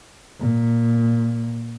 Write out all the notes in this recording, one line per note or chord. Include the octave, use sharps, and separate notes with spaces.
A#2